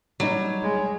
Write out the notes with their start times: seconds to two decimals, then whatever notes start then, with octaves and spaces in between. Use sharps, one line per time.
0.20 F#3 G3 D#4 C#5
0.63 G#3